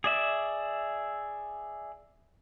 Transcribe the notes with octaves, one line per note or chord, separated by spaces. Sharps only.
G#4 D5 E5